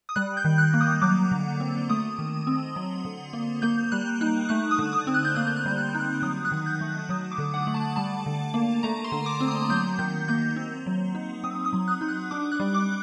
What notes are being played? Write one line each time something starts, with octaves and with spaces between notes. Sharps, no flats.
D#6
G3 F#6
G6
D#3
F#6
A#3
D#6
F#3 D6
D3
C4
A3 D#6
D#3
C4
F#3
D3
A#3
A#3 G6
G3 F#6
D#4 F#6
A3 F#6
D#6
D3
D#6
C4
F#6
G6
A#3 F#6
G6
F#6
G3 G6
F#6
G6
D#4
F#6
F#3 D#6
F#6
D#3
G6
A3
F#3 D#6
D6
D3
F#5
A3
A5
G3 A5
D3
A#3
A3 A#5
C6
D3
D6
C4
D#6
F#3 G6
D#3 G6
A#3 G6
C4
F#3
D#4
C4 D#6
D#6
F#3
F#6
D#4
F#6
D4 D6
F#6
G3
D6